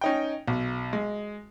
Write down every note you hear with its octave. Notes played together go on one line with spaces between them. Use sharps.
C#4 D#4 G5
B1
G#3